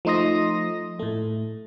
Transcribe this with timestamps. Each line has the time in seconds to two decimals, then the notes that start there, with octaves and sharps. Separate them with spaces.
0.05 F3 A3 D#4 C6 D#6 A#6
0.99 A2 A3